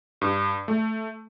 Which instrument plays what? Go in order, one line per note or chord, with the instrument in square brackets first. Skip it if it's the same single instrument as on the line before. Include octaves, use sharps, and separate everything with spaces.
[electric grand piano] G2
A3